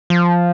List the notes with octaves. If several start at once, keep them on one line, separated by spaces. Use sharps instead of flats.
F3